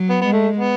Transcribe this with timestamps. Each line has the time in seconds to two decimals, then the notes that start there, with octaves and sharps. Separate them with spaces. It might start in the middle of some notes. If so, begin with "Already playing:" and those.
Already playing: F#3
0.09 B3
0.21 G#3 B3
0.33 A3
0.56 B3